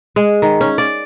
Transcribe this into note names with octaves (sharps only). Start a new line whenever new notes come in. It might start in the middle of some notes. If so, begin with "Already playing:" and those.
G#3
D#3
C#4
D5